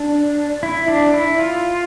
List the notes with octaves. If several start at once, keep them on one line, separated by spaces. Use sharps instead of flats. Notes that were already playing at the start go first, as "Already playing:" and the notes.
Already playing: D4
E4
D4
E4
F4